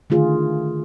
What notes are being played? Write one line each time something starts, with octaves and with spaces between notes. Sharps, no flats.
D3 D#3 A3 F4 G#4